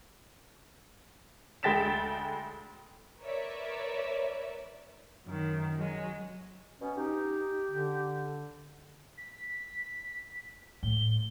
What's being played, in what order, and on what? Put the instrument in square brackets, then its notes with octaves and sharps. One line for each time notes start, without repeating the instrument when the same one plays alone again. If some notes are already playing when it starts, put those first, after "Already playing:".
[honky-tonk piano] D2 G#3 G5 A6 B6 E7
[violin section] A#4 B4 C#5 D5 E5
[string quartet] F#2 D#3
F#3 G#3
[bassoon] B2 [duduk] C#4
[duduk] D#4 [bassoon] G4
[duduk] D3
[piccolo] B6
[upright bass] A2 [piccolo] G7